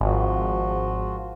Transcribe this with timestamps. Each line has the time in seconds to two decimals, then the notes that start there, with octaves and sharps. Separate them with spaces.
0.01 G#1 F3 F4 F#4